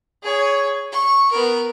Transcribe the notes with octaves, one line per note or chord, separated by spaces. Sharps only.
G#4 C#5
C#6
B3 A#4